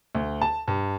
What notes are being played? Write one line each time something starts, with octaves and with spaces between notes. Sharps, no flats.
D2
A5
G2